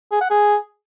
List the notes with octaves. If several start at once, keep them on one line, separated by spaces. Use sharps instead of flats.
G#4
F#5
G#4